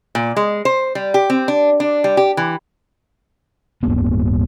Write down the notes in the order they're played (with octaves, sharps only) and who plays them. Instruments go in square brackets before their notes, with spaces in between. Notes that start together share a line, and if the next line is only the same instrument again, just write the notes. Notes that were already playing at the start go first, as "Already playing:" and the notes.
[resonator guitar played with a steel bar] A#2
G#3
C5
G3
G4
C4
D4
D4
G3
G4
E3
[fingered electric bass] D1 G2 A#3 B3